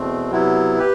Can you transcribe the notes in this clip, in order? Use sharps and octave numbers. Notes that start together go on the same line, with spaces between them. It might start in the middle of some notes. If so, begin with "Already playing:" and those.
Already playing: E2 B2 A3 C4
C3 F#3 B3 E4
G4 B4